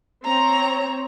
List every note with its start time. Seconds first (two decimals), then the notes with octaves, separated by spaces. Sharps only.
0.24 C4 C#5 A#5